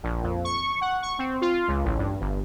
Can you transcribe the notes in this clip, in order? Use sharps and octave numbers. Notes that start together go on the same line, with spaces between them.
A#1
F2
C#6
F#5
C#6
C4
F4
C#2
A1
G2
G1